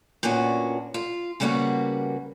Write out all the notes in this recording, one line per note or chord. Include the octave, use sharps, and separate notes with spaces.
A#2 B3 C#4 D4 F#4
F4
C#3 G3 A#3 B3 F4 F#4